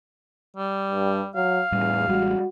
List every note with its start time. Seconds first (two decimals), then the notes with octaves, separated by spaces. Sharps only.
0.56 G3
0.92 G2
1.36 F#3 F5
1.72 E2 A2 G3
2.08 A1 G3 G#3 F#4